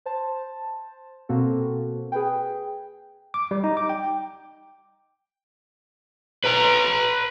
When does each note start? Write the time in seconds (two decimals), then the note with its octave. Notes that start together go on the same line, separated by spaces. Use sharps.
0.06 C5 A5
1.29 B2 A#3 C4 F#4 A4
2.12 G#4 B4 G5
3.34 D6
3.51 G3
3.64 D#4
3.77 D6
3.89 G5
6.45 B4 A#5